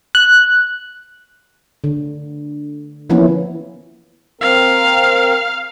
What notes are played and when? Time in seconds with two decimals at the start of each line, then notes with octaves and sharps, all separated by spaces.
0.15 F#6
1.84 D3
3.10 E3 F3 A#3 B3 C#4 E4
4.41 C4 A#4 F5